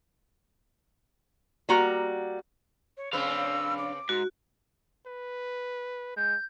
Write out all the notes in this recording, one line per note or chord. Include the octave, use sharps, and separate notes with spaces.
G3 A#3 F#4 A#5
C#5
C#3 C4 D4 B4 F5 E6
D6
G#2 F#4
B4
G#3 G6